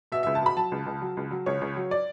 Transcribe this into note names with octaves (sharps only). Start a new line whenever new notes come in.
B2 E5
C#2 E5
A5
B2 B5
F#3 A5
C#2
C#2
F#3
C#2
F#3
C#2 C#5
C#2
F#3
D5